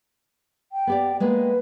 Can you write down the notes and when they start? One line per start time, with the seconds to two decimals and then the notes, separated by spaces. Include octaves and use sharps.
0.72 G5
0.87 B3 G4 D5
1.20 G#3 A#3 B3 B4